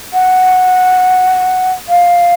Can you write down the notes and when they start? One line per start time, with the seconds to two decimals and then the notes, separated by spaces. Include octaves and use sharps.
0.13 F#5
1.89 F5